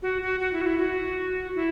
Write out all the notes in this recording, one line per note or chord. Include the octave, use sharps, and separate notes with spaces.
F#4
F#4
F#4
E4
F#4
E4
F#4
E4